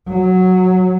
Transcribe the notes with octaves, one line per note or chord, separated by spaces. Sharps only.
F#3